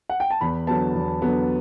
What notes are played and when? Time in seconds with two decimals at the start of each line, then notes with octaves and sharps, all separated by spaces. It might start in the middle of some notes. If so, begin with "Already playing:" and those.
0.09 F#5
0.20 G5
0.30 A5
0.41 E2 B5
0.67 D3 F#3 B3 A5
0.95 E2
1.22 D3 F#3 B3